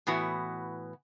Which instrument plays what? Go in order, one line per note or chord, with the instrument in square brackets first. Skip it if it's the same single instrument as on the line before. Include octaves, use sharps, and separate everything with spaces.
[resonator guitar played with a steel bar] A2 E3 B3 F#4